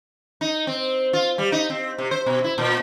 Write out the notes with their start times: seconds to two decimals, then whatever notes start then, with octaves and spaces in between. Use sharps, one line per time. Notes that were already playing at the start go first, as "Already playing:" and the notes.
0.41 D#4
0.67 C4
1.13 F4
1.38 G3
1.52 D#4
1.70 C4
1.98 C3
2.11 C5
2.26 B2
2.44 E4
2.58 A#2